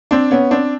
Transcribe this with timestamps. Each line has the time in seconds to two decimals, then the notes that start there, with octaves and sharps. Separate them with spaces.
0.11 C4 D4
0.31 B3 C#4
0.51 C4 D4